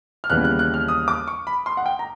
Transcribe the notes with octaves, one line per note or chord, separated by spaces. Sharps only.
F6
D#2 C#3 E3 G3 B3 F#6
F#6
F#6
F6
D#6
D6
C#6
B5
C6
F#5
G5
A#5